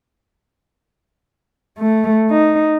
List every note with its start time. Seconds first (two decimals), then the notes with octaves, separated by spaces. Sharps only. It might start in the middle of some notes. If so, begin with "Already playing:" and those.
1.79 A3
2.31 D#4